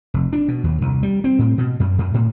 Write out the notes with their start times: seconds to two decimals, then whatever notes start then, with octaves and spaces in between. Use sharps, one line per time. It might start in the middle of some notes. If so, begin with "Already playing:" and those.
0.14 F1
0.33 D4
0.48 B2
0.64 D#2
0.81 C2
1.03 G3
1.24 C4
1.39 A2
1.58 B2
1.80 F#2
1.99 F#2
2.14 A2